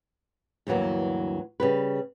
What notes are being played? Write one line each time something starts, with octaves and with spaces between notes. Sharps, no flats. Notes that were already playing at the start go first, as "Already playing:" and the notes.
D2 G2 E3 F#3 A#3
C#3 G3 B4